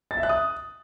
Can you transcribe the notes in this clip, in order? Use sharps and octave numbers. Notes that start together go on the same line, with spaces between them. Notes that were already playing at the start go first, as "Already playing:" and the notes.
A6
E5
F#6
D#6